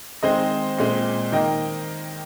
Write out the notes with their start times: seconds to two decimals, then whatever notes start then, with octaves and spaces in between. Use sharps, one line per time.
0.23 D#3 G#3 C4 C5 D#5
0.78 A#2 G#3 C4
1.32 D#3 A#3 D#5 G5